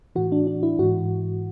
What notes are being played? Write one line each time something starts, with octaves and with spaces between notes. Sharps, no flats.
A2 E3 F#4
D4
D4
E4
G#2 E3 F#4